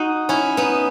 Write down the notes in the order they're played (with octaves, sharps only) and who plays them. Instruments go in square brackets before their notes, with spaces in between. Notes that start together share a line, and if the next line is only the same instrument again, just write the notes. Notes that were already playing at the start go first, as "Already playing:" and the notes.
Already playing: [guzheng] D#4 F#4
C#4 E4
B3 D#4